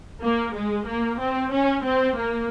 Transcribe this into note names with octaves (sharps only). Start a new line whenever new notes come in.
A#3
G#3
A#3
C4
C#4
C4
A#3